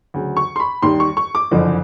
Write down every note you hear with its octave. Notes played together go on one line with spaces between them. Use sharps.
D2 C#3 F#3
C#6
C6
B5
D#2 D#3 G3 C6
C#6
C#6
D6
F#1 F2 D3 F3